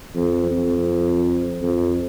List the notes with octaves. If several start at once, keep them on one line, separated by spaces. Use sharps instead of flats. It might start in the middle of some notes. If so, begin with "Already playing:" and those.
F2
F2
F2